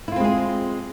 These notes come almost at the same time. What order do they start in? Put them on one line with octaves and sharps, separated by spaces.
E4 F4 C4 G#3 G#4